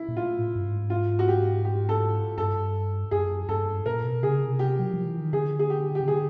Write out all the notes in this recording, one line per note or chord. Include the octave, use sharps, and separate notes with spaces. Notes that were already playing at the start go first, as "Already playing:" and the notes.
Already playing: E4
A#2
A2 F4
G2
G#2
F4
F#4
G4
G4
A4
G2 A4
F#2 G#4
G2 A4
A#2 A#4
B2
C#3 G#4
C3
G4
F#3
F3
E3
D#3
D3 G#4
G#4
G4
C#3 G4
D3 G#4